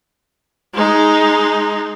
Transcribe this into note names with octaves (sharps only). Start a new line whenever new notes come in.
G#3 D#4